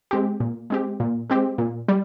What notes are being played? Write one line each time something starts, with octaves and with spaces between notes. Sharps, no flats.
G#3 C4 G4
A#2
G#3 C4 G4
A#2
G#3 C4 G4
A#2
G3